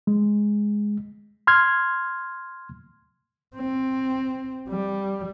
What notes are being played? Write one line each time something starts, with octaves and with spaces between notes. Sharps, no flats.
G#3
C6 F6 G#6
C4
G3